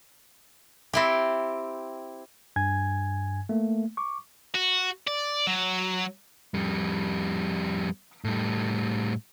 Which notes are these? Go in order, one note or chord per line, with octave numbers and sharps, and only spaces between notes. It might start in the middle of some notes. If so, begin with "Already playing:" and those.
C4 E4 G4
G2 G#5 G#6
A3 A#3
C#6 D6
F#4
D5
F#3
F2 G3
A2 G3